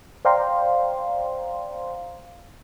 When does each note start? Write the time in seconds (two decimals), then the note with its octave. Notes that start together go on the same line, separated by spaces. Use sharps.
0.25 C5 D5 F5 G5 A#5 C6